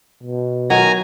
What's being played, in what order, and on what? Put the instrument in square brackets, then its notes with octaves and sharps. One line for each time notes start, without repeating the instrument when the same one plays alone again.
[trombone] B2
[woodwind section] D#3 [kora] F#3 [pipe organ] G#5 A#5